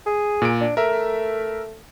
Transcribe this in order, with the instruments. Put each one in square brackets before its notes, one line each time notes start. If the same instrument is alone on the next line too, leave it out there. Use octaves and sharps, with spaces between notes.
[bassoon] G#4
[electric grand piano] A#2 D7
[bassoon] D4
[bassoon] A3 [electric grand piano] A#4 E5